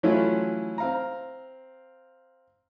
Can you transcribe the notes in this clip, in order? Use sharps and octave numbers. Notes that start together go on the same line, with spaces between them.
E3 F#3 A3 C#4 E4 F4
C4 F5 A#5